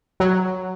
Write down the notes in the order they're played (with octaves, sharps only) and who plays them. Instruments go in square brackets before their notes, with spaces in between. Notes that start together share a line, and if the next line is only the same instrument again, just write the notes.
[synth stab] F#3